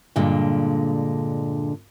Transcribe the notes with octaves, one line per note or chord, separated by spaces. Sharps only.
G2 A#2 D3 G#3